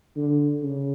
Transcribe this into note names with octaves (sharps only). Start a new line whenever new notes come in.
D3
C#3